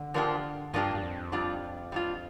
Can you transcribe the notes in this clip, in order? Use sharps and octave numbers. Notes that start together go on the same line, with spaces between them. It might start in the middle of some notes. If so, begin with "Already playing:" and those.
Already playing: D3
F3 A#3 D4 G4
G2 F3 A#3 D4 G4
G2
F2
G3 D4 F4
G3 D4 F4